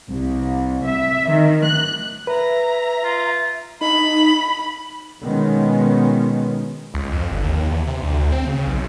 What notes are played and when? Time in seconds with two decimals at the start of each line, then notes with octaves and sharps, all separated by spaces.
0.11 C2
0.86 E5
1.31 D#3
1.65 F#6
2.27 B4 E5 A#5
3.04 F4
3.81 D#4 B5
5.21 B2 D#3 G#3 B3 C#4
6.94 C#2
7.12 F2
7.31 G1
7.43 D#2
7.71 E2
7.87 C3
8.02 D2
8.32 C4
8.46 C#3
8.67 B1